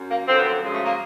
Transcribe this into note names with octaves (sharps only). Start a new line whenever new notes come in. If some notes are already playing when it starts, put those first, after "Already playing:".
Already playing: F#2
A#3
F#2 D3 F3 C4
B3
C4
F#2 C#3 F3 G#3
A3
A#3